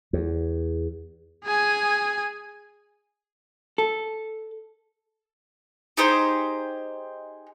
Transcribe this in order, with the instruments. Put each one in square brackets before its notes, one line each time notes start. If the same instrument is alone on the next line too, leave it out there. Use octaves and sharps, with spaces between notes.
[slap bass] E2
[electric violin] G#4 G#5
[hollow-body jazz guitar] A4
[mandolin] D#4 G4 G#4 C5